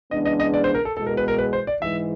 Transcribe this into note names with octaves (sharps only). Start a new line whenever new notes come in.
C#3 E3 G#3 B3 D4 D#5
D#5
D#5
D5
C5
A#4
A4
E2 B2 G#3 A4
A#4
B4
A#4
B4
C5
D5
G#2 E3 G#3 E5